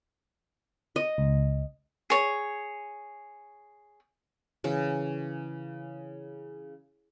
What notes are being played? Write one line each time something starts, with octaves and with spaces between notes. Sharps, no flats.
D#5
C#2
G#4 C#5
C#3 E3